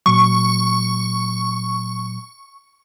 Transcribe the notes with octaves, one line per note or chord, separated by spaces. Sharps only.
A#2 F#3 C#6